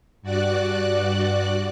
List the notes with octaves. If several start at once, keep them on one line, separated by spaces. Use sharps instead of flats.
G2 F#4 D5 F#6